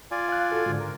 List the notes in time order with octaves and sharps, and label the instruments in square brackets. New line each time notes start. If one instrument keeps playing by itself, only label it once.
[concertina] F4 D5 G#5
[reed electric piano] F5 F#6
F#4 A4
G#2 D3
[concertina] A#4